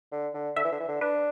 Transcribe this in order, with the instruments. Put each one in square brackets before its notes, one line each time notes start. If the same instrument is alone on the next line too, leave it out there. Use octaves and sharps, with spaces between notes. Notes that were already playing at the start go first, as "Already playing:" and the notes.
[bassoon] D3
D3
[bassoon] D3 [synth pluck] E5
[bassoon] E3
D3
E3
D3
[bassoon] D4 [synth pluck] B4